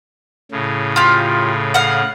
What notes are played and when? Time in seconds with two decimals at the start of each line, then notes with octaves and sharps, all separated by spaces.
0.51 A2 C#3
0.96 F4 G4
1.74 F5 F#5